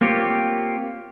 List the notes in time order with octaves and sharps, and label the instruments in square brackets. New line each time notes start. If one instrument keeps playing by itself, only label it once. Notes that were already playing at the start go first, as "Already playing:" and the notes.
[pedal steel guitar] A#3 C4 F4 G4 C#5